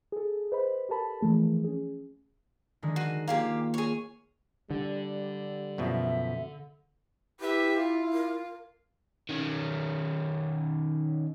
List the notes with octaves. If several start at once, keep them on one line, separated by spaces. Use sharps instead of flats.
G#4 A4
B4 C5 D#5 B5
G4 A4 A#4 A5 B5
E3 F3 A3 G#4 A#4
C#4 G#4
D3 D#3 G#3
F#4 C7 D#7
A#3 F4 G4 G#4 F5
G#4 C#5
D3 G3
F#2 B2 F3 E5
E4 G4 B4 E5
F4
A#4
D#3 C#4